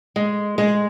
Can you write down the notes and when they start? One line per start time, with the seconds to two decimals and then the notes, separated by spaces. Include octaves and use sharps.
0.16 G#3
0.58 G#3